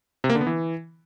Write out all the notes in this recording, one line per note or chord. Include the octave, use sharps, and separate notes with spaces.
C3
A#3
D3
B3
E3